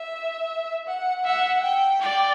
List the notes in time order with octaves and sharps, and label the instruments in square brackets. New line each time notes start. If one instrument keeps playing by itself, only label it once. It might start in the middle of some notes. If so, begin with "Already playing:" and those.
Already playing: [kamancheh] E5
F#5
[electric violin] E5 [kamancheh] F#5
[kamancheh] G5
[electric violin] D5 [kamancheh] G5